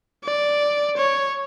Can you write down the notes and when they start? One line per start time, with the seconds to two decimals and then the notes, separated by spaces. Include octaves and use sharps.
0.25 D5
0.97 C#5